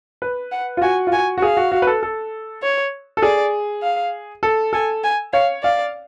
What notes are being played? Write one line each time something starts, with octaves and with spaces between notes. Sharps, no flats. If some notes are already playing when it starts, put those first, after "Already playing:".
B4
F#5
F4
F#4 G#5
F4
F#4 G#5
F#4
G#4 F5
F#4
F#4
B4
A4
A4
C#5
A4
G#4 D5
F5
A4
A4 G#5
G#5
C#5 F5
D5 F5